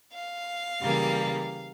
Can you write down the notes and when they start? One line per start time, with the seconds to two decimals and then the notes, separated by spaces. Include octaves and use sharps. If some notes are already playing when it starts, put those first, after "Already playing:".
0.13 F5
0.81 C#3 E3 G3 A#3